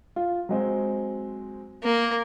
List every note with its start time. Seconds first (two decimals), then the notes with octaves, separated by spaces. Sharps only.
0.16 F4
0.49 F#3 G#3 C4
1.83 A#3